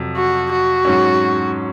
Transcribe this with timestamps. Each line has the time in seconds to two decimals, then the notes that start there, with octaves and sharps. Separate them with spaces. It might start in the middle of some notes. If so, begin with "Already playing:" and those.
Already playing: F2 C3 F#3
0.17 F#4
0.52 F#4
0.85 G#2 F#3 C#4